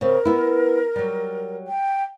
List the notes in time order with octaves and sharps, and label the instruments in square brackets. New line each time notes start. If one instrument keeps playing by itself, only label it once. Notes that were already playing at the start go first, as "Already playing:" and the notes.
[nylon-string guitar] C#3 C4 [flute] A#4
[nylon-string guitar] B3 E4
F#3 G3
[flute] G5